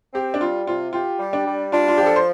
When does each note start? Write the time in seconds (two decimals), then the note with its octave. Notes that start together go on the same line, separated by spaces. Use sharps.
0.14 C4 G4
0.34 D4
0.41 G3 F4
0.67 C3 F4
0.93 F4 G4
1.19 G3
1.33 D4
1.46 G3
1.72 D4 F4
1.88 F4
1.98 F3 G4
2.06 A4
2.16 C5